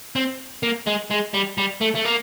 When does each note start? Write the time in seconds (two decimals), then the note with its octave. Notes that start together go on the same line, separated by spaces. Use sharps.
0.16 C4
0.63 A#3
0.87 G#3
1.10 G#3
1.34 G3
1.58 G3
1.81 A3
1.95 A3
2.05 A#3